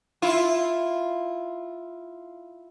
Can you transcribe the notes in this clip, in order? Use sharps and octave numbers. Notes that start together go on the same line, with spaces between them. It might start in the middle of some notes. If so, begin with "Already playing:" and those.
E4 F4